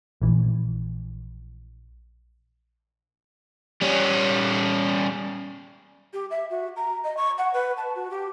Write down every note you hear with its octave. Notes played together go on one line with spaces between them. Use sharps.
A#1 E3
G3 C#4
G4
E5
F#4
A#5
D#5
C#6
F#5
B4
A5
F#4
G4